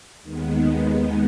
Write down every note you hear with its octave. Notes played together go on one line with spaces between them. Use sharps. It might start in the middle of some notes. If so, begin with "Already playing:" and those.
D#2 D#3 G#3 B3